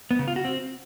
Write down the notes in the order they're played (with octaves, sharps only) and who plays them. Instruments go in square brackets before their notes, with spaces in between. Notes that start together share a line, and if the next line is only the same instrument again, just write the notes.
[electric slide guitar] B3
C#3
F4
F#4
C4